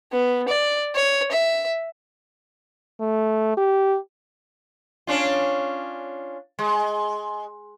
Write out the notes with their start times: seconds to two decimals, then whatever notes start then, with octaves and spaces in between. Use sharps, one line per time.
0.12 B3
0.49 D5
0.95 C#5
1.31 E5
3.00 A3
3.57 G4
5.07 C#4 D4 F4
6.59 G#3